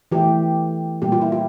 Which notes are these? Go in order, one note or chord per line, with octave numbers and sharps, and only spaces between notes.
E3 A3 G4
A#2 G3 A#3 G4
F4
E4
F4